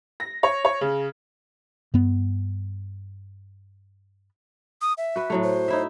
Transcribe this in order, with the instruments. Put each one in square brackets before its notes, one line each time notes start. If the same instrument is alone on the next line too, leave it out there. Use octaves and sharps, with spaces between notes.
[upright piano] A#6
C#5
C#5
C#3
[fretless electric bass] G2 B3
[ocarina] D#6
E5
[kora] F#4 B4
A2 F#3 A3
[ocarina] C5
[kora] D#4 E4 E5